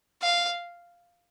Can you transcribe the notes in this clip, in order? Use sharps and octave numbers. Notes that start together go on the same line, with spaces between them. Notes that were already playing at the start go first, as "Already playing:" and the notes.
F5